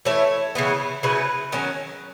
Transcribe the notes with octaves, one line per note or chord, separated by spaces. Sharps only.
E3 A3 E4 C#5
C#3 E3 B3
C#3 F#3 C#4 E4 B4
D#3 F#3 C#4